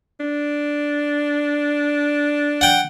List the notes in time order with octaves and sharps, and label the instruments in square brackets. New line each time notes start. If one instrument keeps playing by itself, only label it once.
[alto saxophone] D4
[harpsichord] F#5 G5